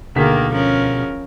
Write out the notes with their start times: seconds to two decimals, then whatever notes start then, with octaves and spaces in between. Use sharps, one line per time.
0.16 D2 B2 D#3 A#3 G#4 B6
0.52 F3 C#4 A#4